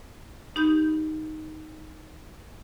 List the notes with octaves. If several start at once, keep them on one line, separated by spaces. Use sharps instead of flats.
D#4 G4 B5 G6